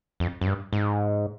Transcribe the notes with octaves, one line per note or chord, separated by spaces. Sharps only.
F2
F#2
G2
G#2